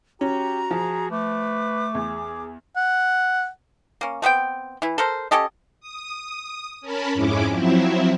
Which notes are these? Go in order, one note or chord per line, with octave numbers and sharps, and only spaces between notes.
C#4 F#4 G4 A#5
F3 G#4
A3 B4 D6
E2 G#4
F#5
A#3 C#4
A3 B3 C4 G5
E3 E4
A4 A#4 C5
C#4 G4 A4 D#5
D#6
C#4 A#4 A5 B5
F2 G#2 G#3 C#4 E4 D6
F3 F#3 C4 E4 E5